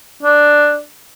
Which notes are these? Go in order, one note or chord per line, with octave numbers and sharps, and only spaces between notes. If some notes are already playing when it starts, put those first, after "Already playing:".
D4